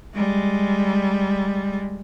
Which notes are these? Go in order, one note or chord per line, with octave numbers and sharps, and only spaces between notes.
G3 G#3